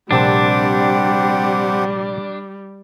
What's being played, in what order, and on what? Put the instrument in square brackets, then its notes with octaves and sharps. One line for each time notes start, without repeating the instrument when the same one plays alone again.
[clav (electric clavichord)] A#1 C3 A5 [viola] G3 [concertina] C4 G4 F#5 [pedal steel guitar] D4